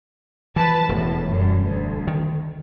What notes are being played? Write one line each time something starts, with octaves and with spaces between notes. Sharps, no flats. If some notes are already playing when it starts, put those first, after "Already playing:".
E3 F3 B4 A5
E1 E2 A2
F#2 G3
D2
D#3